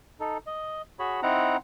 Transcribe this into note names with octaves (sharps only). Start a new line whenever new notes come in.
D#4 A4
D#5
F#4 G#4 C#5 B5
C4 D#4 E4 F#5 A#5